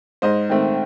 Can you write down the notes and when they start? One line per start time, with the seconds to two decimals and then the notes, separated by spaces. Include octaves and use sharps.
0.22 G#2 C5 D#5
0.49 D#3 A3 C4